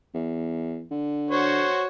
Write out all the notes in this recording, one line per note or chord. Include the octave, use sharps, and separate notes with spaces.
E2
D3
F#4 C5 C#5